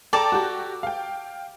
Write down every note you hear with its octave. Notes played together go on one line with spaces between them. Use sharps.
A4 D5 G5 A5 A#5
F#4 G4
F5 G5